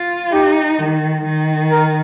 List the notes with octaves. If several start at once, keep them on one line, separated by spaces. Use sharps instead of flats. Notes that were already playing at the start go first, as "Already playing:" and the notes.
Already playing: F4
D#4 G4
D#3
D#3
A#4